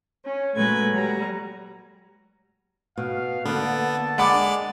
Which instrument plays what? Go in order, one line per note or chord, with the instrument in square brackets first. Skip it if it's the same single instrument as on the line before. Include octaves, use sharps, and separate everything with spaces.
[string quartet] C#4
A#2 F#3 G#3 A3 B4 G#6
F#3 G3 A#5
[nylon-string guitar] B2 [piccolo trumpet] F5
[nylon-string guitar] D3 A#3 [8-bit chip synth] B3 [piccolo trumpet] A5
[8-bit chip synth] G#3 D5 A6 [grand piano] F#5 B5 D6